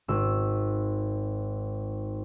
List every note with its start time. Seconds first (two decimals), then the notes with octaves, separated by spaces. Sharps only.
0.08 G#1 E6